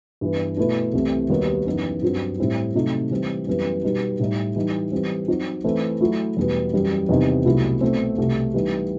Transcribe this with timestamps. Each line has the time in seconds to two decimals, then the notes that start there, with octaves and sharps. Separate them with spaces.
0.21 G2 E3 B3
0.57 B2 A3 E4 B4
0.93 C2 C3 E3 A3
1.30 D#2 D#3 G3 B3 F#4
1.66 F#2 E3 B3 D#4
2.02 G2 F#3 C4 F#4
2.39 A2 G3 C4 E4
2.75 C3 F#3 A3 D#4
3.11 E3 G3 C4
3.47 F#2 E3 G3 B3
3.83 B2 G3 B3 D#4 F#4
4.19 A2 G3 D#4
4.56 E3 G3 D#4
4.92 E3 G3 C4
5.28 F#3 C4 D#4 F#4
5.64 E3 A3 C4 E4 A4
6.00 F#3 A3 E4
6.37 E2 B2 G3 B3
6.73 F#2 E3 G3
7.09 E2 C3 D#3 G3 D#4
7.45 C2 B2 F#3 A3 E4
7.81 B2 A3 C4
8.18 C2 B2 A3
8.54 E3 G3 B3 D#4